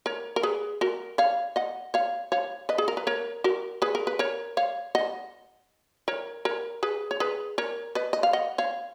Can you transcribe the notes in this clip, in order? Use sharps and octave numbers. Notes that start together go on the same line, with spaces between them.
A#4 C#5
A#4
G#4 B4
F#4 A#4
C#5 F5
D#5 F#5
C#5 F5
C#5 F5
B4 D#5
G#4
A#4
B4
A#4 C#5
F#4 A#4
G#4 B4
A#4
B4
A#4 C#5
C#5 F5
D#5 F#5
A#4 C#5
A#4 C#5
G#4 B4
C#5
G#4 B4
A#4 C#5
B4 D#5
D#5
F5
D#5 F#5
C#5 F5